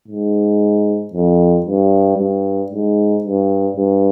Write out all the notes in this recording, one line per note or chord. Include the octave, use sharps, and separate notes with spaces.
G#2
F2
G2
G2
G#2
G2
G2